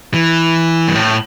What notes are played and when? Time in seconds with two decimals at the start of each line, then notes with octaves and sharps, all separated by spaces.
0.14 E3
0.87 G2
0.95 A2